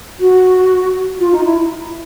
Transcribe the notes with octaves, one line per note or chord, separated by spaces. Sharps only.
F#4
F4
D#4
E4